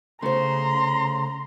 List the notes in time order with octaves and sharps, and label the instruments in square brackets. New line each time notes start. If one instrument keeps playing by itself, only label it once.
[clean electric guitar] C#3 [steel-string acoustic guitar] A3 C5 [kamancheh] A#5 C6